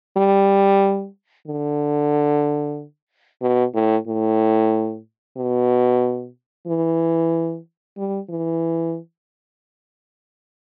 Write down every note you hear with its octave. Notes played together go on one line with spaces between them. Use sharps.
G3
D3
B2
A2
A2
B2
E3
G3
E3